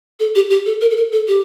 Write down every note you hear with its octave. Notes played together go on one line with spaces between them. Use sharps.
A4
G4
G4
A4
A#4
A4
A#4
A4
G4